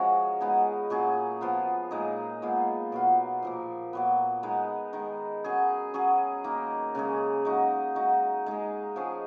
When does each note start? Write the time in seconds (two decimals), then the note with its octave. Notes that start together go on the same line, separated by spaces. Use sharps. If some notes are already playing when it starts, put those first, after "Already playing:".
Already playing: F3 G#3 A#3 C#4 F#4
0.41 G#3 B3 D#4 G#4
0.90 A#2 F#3 C#4 G#4
1.41 F3 B3 F4
1.91 A#2 G#3 D#4 G#4
2.42 A#2 G#3 B3 F4
2.92 B2 F#3 B3 F4
3.43 A#2 F3 A#3
3.93 A#2 F#3 B3
4.43 G#3 B3 D#4
4.93 D#3 G#3 D#4
5.44 F#3 C#4 G#4
5.94 F#3 C#4 G#4
6.44 D#3 A#3 D#4
6.95 C#3 G#3 C#4 G#4
7.45 G#3 D#4 F#4
7.95 G#3 D#4 F#4
8.46 G#3 D#4 G#4
8.96 F3 G#3 C#4 G#4